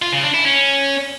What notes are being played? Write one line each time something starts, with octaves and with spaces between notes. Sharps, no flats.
F4
C#3
D4
E4
C#4